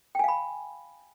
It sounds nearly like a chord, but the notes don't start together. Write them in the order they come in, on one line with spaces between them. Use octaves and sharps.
G5 G#5 F5 B5